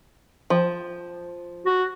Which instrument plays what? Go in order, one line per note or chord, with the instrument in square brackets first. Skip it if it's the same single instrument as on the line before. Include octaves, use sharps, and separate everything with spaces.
[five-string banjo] F3
[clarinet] F#4